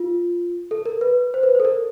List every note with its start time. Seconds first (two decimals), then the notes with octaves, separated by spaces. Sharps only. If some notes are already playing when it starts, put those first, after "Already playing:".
Already playing: F4
0.71 A4
0.86 A#4
1.01 B4
1.34 C5
1.43 B4
1.55 C5
1.60 A4
1.65 A#4